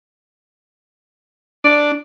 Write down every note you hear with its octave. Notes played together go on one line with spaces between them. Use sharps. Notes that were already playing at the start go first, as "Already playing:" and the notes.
D4 D5